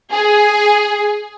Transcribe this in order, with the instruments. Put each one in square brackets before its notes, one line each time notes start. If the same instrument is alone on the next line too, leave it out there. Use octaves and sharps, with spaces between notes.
[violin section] G#4